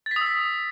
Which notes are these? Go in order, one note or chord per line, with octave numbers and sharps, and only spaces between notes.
A6
B6
D#6
E6
B6